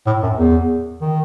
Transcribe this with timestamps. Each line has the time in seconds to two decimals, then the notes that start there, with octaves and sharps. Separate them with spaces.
0.06 A2
0.23 F#2
0.38 E2
1.01 D#3